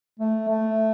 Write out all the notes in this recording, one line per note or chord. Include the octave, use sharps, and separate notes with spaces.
A3
A3